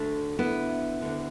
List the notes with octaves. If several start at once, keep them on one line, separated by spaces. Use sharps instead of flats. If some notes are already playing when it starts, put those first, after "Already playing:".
Already playing: D2 D3 A3 D4
B3 E4
D2 D3